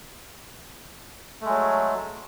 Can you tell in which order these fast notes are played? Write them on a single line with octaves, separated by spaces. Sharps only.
A3 G#3 F#3